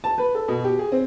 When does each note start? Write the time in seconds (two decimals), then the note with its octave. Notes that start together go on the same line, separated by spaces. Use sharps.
0.04 A5
0.18 B4
0.35 A4
0.48 B2
0.64 G4
0.79 G#4
0.92 C4